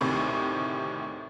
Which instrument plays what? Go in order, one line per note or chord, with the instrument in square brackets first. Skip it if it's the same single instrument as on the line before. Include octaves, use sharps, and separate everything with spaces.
[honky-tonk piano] D2 A2 C3 D#3